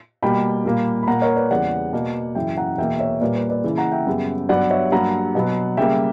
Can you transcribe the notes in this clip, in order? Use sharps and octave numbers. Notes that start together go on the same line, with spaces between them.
B2 G3 A#3 G5 B5
A#2 G3 A#3
B5
A#2 A#3 F#5 A#5
A#4 C#5
B4 D5
E2 C#3 E3 G3 D5 F#5
B2 A#3
F#2 C#3 E3 E5 G5
F#5 A#5
E2 B2 A#3 E5 G5
C#5 E5
A#2 G3 A#3 B4 D5
B4
B4 D5
C#3 E3 A#3
F#5 A#5
E5 G5
F#2 C#3 G3 B3
G2 F#3 B3 D5 F#5
C#5 E5
G2 F#3 A#3 F#5 A#5
B2 F#3 B3
C#3 G3 A#3 E5 G5